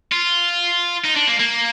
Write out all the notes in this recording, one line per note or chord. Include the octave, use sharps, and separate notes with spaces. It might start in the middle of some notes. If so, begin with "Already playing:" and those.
F4
D#4
D4
A#3
A#3